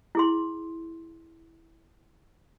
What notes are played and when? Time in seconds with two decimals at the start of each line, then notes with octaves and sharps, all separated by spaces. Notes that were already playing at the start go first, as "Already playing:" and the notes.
0.15 E4 G#4 C6